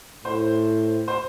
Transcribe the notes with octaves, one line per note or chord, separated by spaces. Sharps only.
A2 C5
C5